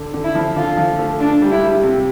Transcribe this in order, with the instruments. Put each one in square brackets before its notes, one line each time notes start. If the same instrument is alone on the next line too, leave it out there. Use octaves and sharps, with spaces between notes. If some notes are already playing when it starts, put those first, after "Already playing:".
Already playing: [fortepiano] D3
D3
[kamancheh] E4
[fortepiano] F3
[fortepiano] D3 [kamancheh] F4
[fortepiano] F3
A3
[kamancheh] D4 [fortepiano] F4
[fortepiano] G3
[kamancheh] E4
[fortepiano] G3
C3